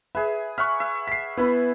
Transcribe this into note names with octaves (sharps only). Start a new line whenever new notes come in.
G#4 B4 E5
E5 F#5 C#6 F6
E5
B6 C7
B3 E4 B4